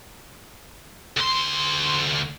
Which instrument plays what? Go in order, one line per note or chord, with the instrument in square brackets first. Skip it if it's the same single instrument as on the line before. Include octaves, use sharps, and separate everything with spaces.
[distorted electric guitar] D2 C6